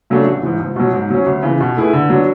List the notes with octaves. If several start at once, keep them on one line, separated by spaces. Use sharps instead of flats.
C#3 F#3 A3 D4
A1
G#2 E3
C#2
B2 F#3
G#2
F#3 C#4
D2
C#3 E3 B3
B2
A3 E4 G#4 B4
D3
F#3 B3 D4